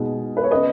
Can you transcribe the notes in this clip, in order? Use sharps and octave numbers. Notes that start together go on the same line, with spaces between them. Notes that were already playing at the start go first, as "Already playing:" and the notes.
Already playing: B2 G#3 D#4
B4
C#5
C#3 B3 B4 D#5